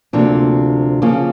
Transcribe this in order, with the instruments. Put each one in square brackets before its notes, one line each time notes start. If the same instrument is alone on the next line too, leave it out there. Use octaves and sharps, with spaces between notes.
[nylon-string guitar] D2 C3 F3 A#3 D4
C#3 F3 A#3